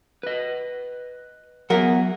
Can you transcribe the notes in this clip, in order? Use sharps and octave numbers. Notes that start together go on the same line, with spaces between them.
B4 D#5
F#3 B3 G#4 A#4 E5 F#5